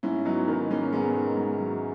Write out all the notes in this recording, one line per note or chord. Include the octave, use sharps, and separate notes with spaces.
G#2 C#4 E4
F#3 B3 D#4
D#3 B3 D#4
G#2 A#3 C#4
C#4
G#2 G#3 B3
D#3
G#2
F#3